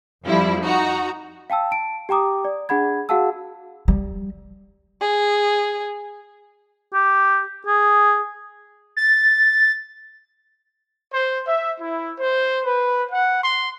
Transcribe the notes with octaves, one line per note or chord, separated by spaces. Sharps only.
F2 F3 G3 E4
D#4 F#4 A#5
F5 G5 A5 E6
A5 D7
G4 G5 A#5 D6 D#6
D5
D4 G#4 F#5 B5 G#6
F#4 G#4 F5 F#5 A5 E6
G3
G#4
G4
G#4
A6
C5
E5
E4
C5
B4
F#5
C6